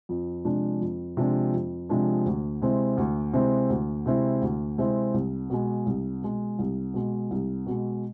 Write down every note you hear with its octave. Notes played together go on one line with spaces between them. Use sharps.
F2
C3 F3 G#3 D4
F2
C3 F3 G#3 D4
F2
C3 F3 G#3 D4
D2
C3 G#3 C4 E4
D2
C3 G#3 C4 E4
D2
C3 G#3 C4 E4
D2
C3 G#3 C4 E4
C2
B2 G#3
C2
B2 G#3
C2
B2 G#3
C2
B2 G#3